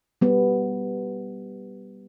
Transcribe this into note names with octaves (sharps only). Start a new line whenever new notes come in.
G3 B3